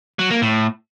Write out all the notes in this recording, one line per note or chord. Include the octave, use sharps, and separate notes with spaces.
F#3
A#3
A2